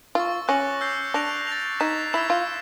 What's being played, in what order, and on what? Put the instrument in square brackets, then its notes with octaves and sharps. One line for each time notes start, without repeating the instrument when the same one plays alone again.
[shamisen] F4 [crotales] C#6 E6 A6
[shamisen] C#4 [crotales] D6 F#6 A#6 C#7 F#7
[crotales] E6 G6 C7
[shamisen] D4 [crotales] F#6 A#6 D7 F7
[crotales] A6 C7 F7
[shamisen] D#4 [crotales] G#6 B6 E7
[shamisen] E4 [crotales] E6 G#6 B6 E7
[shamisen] F4